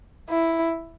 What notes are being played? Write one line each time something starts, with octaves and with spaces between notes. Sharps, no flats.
E4